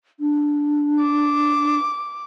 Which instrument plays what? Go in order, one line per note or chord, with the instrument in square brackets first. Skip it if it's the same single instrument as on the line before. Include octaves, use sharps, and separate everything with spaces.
[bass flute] D4
[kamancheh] D6